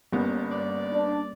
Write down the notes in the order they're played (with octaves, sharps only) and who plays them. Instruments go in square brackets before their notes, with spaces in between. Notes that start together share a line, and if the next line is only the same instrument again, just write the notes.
[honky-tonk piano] G1 B3 [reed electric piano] G3 A#3 C#4
[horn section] D5
[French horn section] D4